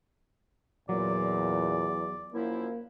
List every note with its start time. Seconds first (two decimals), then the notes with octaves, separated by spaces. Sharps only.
0.89 E2 A#2 F#3 D5
2.33 F#2 F3 A#3 E4